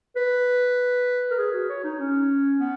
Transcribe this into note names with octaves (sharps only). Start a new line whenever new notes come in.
B4
A#4
G#4
F#4
C#5
D#4
C#4
B3